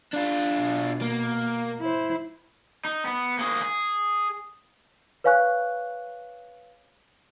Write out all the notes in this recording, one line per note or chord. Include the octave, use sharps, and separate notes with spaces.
D4 F4
B2
A#3
E4 C5
D#4
B3
A#3 G#4
G#4
B4 C#5 F5 G#5 C#6 F#6